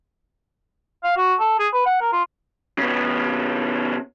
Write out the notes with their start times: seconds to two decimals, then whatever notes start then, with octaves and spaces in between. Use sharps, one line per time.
1.03 F5
1.16 F#4
1.40 A4
1.59 G#4
1.73 B4
1.86 F#5
2.00 A#4
2.12 F4
2.79 C#3 B3